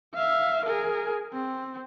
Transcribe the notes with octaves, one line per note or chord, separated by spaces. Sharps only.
E5 F5
G#4 A#4
C4